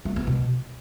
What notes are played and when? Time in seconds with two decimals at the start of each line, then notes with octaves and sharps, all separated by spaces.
0.05 A3
0.16 B3
0.27 B2